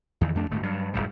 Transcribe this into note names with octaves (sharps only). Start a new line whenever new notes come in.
E2 D#3 E3
F2 A3 D4
D1 D2 G#2 A3
G2 F#3
E1 A1 G#2 G3